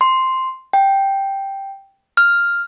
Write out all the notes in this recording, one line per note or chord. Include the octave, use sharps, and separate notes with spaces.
C6
G5
F6